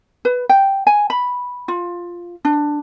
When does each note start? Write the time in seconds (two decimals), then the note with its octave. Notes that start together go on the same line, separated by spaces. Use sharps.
0.25 B4
0.49 G5
0.87 G#5
1.10 B5
1.68 F4
2.45 D4